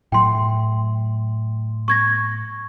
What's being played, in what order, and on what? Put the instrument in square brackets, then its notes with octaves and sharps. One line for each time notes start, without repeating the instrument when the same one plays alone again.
[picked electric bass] A2 F#3 [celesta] G5 C6
[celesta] C#6 G#6 A#6